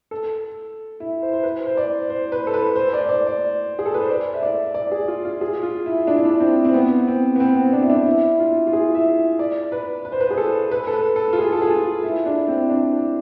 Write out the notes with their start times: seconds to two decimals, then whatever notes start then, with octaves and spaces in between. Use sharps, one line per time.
0.11 A4
1.00 E4
1.22 C5
1.33 C5
1.43 B4
1.66 C5
1.77 D5
2.10 C5
2.32 B4
2.47 A4
2.54 B4
2.76 C5
2.93 D5
3.09 D5
3.27 D5
3.79 G#4
3.86 A4
3.94 B4
4.02 C5
4.09 D5
4.34 E5
4.42 D5
4.74 D5
4.91 G#4
5.08 F4
5.25 F4
5.41 G#4
5.63 F4
5.86 E4
6.07 D4
6.17 E4
6.25 D4
6.40 C4
6.65 C4
6.74 B3
7.07 C4
7.36 B3
7.40 C4
7.56 C4
7.73 D4
7.81 E4
7.90 D4
8.06 E4
8.40 F4
8.67 F4
8.73 G#4
8.95 E5
9.39 D5
9.72 B4
10.05 B4
10.12 C5
10.20 B4
10.31 G#4
10.38 A4
10.71 B4
10.87 A4
10.93 B4
11.16 A4
11.33 F4
11.38 G#4
11.52 A4
11.62 G#4
11.70 F4
12.03 E4
12.26 D4
12.48 C4
12.70 D4